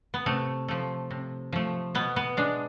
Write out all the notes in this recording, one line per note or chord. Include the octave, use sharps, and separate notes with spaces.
B3
C3 A3
F3 A3
C3
F3 A3
B2 B3
B3
G#3 D4